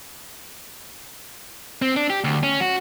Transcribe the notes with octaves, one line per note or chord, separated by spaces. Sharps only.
C4
D4
G4
D2
C#4
F#4